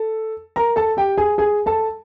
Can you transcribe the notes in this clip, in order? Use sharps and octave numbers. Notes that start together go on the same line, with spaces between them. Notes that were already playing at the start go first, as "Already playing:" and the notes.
Already playing: A4
A#4 A#5
A4 A5
G4 G5
G#4 G#5
G#4 G#5
A4 A5